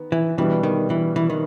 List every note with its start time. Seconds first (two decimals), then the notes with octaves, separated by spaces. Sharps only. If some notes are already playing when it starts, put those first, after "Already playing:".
Already playing: D#3 B3
0.12 E3
0.38 B2 E3 G3 B3 D4
0.63 D#3
0.90 E3
1.16 E3
1.30 D#3